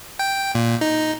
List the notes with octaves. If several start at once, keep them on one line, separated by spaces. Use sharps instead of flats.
G5
A#2
D#4